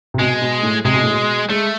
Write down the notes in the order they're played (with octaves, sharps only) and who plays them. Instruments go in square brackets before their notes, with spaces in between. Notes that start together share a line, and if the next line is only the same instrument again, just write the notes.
[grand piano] C3
[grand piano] B2 [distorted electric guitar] G#3
[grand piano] B2
A2
[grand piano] C3 [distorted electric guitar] G#3
[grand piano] B2
A2
B2
[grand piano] G#3 [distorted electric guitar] A3